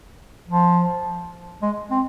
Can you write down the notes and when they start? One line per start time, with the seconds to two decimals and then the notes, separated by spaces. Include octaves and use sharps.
0.48 F3
1.62 G#3
1.91 C4